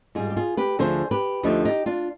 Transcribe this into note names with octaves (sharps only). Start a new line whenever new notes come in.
G#2 G3 F4 G#4
G4
F4 G#4
G4 B4
D2 D3 F3 G#4 C5
G4 B4
D2 D3 F3 D#4 G4
D#4 G4
D4 F4